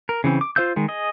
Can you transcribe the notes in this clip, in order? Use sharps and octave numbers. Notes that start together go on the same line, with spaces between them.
A#4
C#3 E3 C4
D6
F4 C5 F5 E6 G6
D#3 G#3
G#4 D#5